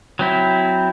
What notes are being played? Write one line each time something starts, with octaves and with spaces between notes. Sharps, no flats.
F#3 C4 E4